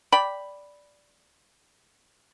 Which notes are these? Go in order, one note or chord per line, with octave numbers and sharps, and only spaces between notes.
D5 G5 B5